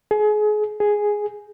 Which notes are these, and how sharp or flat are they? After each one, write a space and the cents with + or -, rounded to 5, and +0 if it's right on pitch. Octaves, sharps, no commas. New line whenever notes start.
G#4 +30
G#4 +0